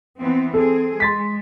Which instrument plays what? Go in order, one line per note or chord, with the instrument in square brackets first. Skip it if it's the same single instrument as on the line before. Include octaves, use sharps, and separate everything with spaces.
[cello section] E3 B3 C4
[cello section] C4 G#4 [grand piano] A4
[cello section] G#3 [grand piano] C6 A6 B6